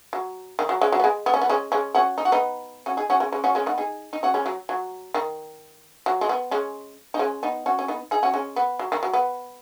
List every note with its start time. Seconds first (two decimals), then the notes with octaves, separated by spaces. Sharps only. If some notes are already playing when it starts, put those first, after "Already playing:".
0.13 F#3
0.59 D#3
0.69 F#3
0.81 G#3 C#4
0.92 F#3
1.00 B3
1.04 G#3
1.26 B3
1.34 C#4
1.42 B3
1.49 G#3 C#4
1.72 G#3 C#4
1.95 C#4 F#4
2.18 D#4
2.25 F#4
2.32 B3 D#4
2.86 C#4 F#4
2.97 D#4 G#4
3.10 C#4 F#4
3.20 G#3 C#4
3.32 G#3 C#4
3.44 C#4 F#4
3.55 G#3 C#4
3.66 B3 D#4
3.78 D#4 G#4
4.13 D#4
4.23 C#4 F#4
4.34 G#3 C#4
4.46 F#3
4.69 F#3
5.14 D#3
6.06 F#3
6.21 G#3
6.29 B3
6.51 G#3 C#4
7.14 D#4
7.19 G#3 C#4
7.43 B3 D#4
7.66 C#4 F#4
7.79 C#4
7.88 B3 D#4
8.11 D#4 G#4
8.23 C#4 F#4
8.34 G#3 C#4
8.56 B3
8.79 F#3
8.92 D#3
9.03 F#3
9.13 B3